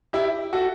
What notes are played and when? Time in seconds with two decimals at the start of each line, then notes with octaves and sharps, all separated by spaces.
0.13 E4 G4
0.53 F#4 A4